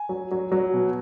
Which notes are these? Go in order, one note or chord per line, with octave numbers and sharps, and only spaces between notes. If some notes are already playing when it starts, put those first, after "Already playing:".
Already playing: G#5
F#3
F#3
F#3
B2